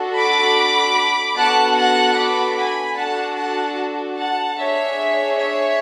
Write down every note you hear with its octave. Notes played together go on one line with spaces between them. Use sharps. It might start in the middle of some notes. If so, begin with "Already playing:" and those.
Already playing: D4 F#4 A4
B5 D6
B3 D4 F#4 A4 F#5 A5
F#5 A5
B5 D6
G#5 B5
D4 F#4 A4 F#5 A5
F#5 A5
F#5 A5
D4 G#4 C#5 E5
C#5 E5